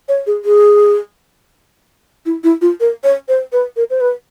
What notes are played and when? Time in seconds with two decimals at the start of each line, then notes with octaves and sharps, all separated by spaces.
0.09 C#5
0.27 G#4
0.45 G#4
2.26 E4
2.44 E4
2.61 F4
2.80 A#4
3.04 C#5
3.28 C5
3.52 B4
3.77 A#4
3.90 C5
4.01 B4